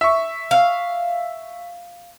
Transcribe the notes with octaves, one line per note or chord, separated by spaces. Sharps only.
E5 C#6
F5